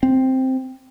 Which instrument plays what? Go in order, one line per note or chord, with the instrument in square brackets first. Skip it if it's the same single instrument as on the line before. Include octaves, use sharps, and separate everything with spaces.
[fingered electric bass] C4